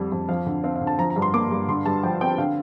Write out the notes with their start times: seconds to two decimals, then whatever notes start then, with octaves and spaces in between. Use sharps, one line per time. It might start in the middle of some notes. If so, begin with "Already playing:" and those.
Already playing: F2 D3 G3
0.12 F2
0.29 F3 F5
0.46 D3
0.64 C4 F5
0.76 F5
0.81 D3
0.87 A5
0.98 F3 A#5
1.10 A#5
1.16 G2
1.22 C6
1.34 A#3 D6
1.51 G2
1.69 D3 C6
1.86 G2 A5
2.03 F3 G5
2.21 C4 G5
2.38 D3 F5